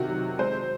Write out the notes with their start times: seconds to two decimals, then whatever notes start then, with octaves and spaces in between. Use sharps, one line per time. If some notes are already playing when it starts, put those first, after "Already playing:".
Already playing: C3 D#3 F#4
0.09 F#3
0.39 G#3 C5